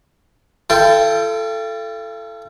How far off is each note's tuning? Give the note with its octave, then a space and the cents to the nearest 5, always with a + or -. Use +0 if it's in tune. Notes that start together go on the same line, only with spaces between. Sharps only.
F4 -45 A4 +0 G5 +0